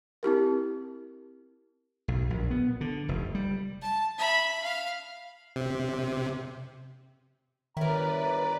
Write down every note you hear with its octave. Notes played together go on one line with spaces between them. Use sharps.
C4 E4 G4 A#4
B1
A#1
B3
D3
F1
G3
A5
E5 B5
F5
C3
G1 D#3 E4 A#4 B4 C#5 D5 A#5